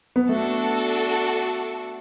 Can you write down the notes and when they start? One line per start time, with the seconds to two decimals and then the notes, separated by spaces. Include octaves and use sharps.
0.16 B3
0.28 A3 D4 F#4 A4